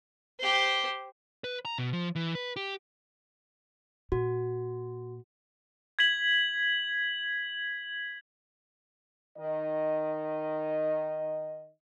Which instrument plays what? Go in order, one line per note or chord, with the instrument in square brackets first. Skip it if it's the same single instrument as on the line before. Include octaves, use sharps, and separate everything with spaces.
[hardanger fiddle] G4 C5
[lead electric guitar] B4
A#5
B2
F3
E3
B4
G4
[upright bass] A#2 [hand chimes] F#4
[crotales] G#6 B6 F#7
[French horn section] D#3 D#5